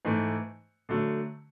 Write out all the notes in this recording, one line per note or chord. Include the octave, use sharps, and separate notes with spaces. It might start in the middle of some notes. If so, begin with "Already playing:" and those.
G#2 E3 A3
D3 F#3 A3